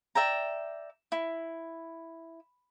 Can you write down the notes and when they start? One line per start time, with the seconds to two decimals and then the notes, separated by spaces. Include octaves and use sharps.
0.15 D5 E5 G5 A#5
1.12 E4